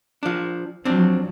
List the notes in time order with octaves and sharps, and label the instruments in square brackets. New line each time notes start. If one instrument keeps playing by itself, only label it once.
[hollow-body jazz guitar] F3 D4
[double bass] F3 F#3 [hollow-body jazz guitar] C4 D4